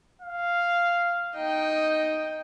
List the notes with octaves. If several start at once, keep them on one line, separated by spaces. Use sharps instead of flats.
F5
D#4 D#5 G5